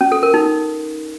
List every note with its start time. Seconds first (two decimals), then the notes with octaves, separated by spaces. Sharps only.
0.01 C#4
0.12 A4
0.23 A#4
0.34 D#4